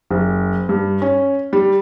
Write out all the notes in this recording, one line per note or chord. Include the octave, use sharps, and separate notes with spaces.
F#1
G2
C#4
G3